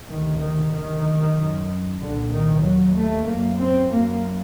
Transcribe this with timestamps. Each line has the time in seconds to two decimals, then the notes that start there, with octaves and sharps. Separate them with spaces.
0.09 D2 C3 D#3
0.40 D#3
0.73 D2 C3 D#3
1.37 F#2
2.00 C2 A#2 D3
2.32 D#3
2.64 D#2 F#3
2.96 A3
3.28 F#2 A#3
3.59 C4
3.91 F#2 A#3